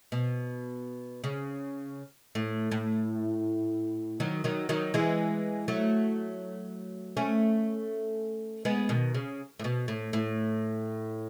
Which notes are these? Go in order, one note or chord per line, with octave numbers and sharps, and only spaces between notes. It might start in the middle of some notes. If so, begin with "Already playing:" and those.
B2
C#3
A2
A2
D#3 F#3
D#3 F#3
D#3 F#3
E3 G#3
F#3 A3
A3 C#4
G#3 B3
B2 D#3
C#3
A2
B2
A2
A2